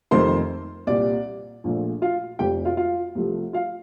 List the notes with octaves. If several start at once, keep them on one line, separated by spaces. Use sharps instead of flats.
F2 C3 D#3 A3 C5 C6
C2 A#2 G3 D5
A#1 A#2 F3 A3
F4 F5
F1 F2 C3 F3 A3 G4 G5
F4 F5
F4 F5
C2 C3 F3 A3
F4 F5